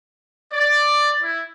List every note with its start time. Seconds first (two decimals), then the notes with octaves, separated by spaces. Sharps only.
0.54 D5
1.23 E4